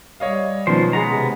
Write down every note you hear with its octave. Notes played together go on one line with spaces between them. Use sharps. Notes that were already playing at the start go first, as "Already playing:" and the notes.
G3 C#5 D#5 F5
B2 D#3 F3 C#4 C5
G#3 B3 G#4 A#5
C3